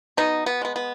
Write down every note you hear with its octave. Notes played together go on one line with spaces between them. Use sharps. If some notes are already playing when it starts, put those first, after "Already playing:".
B2 B3 D#4
B3
G#3 B3
B3